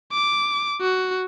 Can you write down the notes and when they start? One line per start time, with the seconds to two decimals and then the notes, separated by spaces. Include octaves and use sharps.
0.13 D6
0.81 F#4